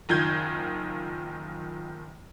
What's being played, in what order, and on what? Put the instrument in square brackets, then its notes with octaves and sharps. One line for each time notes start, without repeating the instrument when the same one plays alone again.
[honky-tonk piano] F#1 D#3 F4 G6 G#6